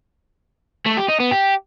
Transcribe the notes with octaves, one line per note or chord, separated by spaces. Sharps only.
A3
G4
D#4
B3
G4